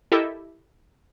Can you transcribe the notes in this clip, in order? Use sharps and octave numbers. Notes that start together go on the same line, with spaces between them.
E4 G4 A4 A#4 D#5 E5